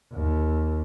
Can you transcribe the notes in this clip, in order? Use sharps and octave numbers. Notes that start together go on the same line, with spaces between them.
D#2